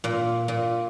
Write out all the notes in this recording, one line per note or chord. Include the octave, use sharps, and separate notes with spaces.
A#2
A#2